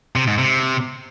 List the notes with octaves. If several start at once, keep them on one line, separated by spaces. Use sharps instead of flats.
C3
G#2
C3